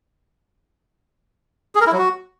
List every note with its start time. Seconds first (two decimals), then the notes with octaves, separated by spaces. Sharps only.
1.75 G#4
1.81 A#4
1.87 E4
1.92 F#3
1.98 F#4